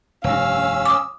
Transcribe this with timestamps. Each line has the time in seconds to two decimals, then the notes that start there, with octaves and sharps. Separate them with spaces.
0.24 F1 G2 C#4 F5 E6
0.86 D6 D#6